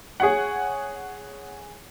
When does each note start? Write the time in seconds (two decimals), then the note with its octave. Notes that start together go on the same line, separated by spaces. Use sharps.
0.20 G#4 C#5 F#5